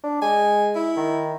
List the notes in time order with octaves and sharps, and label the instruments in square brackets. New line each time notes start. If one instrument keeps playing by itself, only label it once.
[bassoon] D4
[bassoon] G#3 [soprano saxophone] G#5
[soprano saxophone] E4
[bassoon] D#3